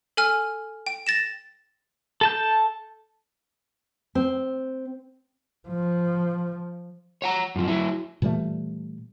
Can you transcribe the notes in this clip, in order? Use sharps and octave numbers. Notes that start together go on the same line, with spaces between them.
A4 G#5 F6
G5
A6 A#6 E7
A4 A5 G6
C4
F3
C#5 F#5 A#5
F#2 F3
F#3 E4
A#2 E3 G3 A3